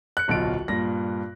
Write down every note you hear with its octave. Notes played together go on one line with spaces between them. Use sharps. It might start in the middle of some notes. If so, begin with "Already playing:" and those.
F#6 C#7
D1 B1 F#3 F4 D7
G2 A#2 A#6